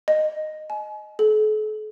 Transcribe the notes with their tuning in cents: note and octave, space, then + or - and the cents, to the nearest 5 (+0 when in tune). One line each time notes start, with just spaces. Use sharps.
D#5 -10
G#5 +35
A4 -45